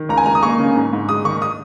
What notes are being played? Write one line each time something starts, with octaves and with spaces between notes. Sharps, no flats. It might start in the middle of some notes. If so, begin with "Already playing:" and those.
Already playing: D#3
C#2 A#5
G#5
C#2 A#5
D#6
A#3 C#6
C#3
G#2
G#2
G#3 D#6
D#3 C#6
D#6